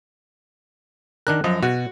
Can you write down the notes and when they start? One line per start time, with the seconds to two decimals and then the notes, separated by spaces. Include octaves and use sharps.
1.27 D#3 D4 A#4 F#6
1.44 F#2 F3 D#5
1.63 B2 F#4